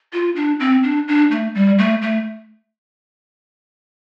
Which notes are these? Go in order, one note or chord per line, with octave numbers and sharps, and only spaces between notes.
F4
D4
C4
D4
D4
A3
G3
A3
A3